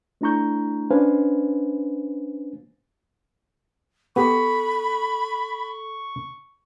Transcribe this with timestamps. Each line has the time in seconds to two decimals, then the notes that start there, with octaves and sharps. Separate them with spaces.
0.21 A3 D4 E4 A#5 C#6 G6
0.90 C#4 D4 B4 C5 F5 G#5
4.16 B3 G4 A4 B5 C#6